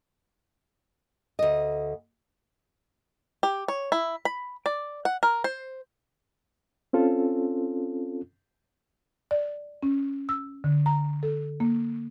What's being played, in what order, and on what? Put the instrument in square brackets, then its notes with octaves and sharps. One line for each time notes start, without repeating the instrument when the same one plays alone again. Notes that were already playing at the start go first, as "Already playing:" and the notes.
[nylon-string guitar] D2 D#5
[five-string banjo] G4
C#5
E4
B5
D5
F#5
A#4
C5
[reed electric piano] C4 C#4 F4 A4
[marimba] D5
C#4
E6
D3
A#5
A4
A#3